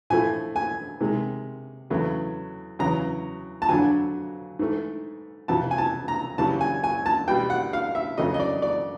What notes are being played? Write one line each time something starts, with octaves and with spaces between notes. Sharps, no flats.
A2 F3 A3 G#5
G#5
C3 D#3 G#3
E2 C#3 F#3 A3
E2 C#3 F#3 A#5
A5
F2 D3 F#3 G#5
G#2 E3 A3
F2 C3 E3 A5
G#5
A5
A#5
F#2 C#3 E3 G3 A5
G#5
G#5
A5
B2 G3 G5
F#5
F5
E5
F2 C#3 F#3 A3 D#5
D#5
D5
D5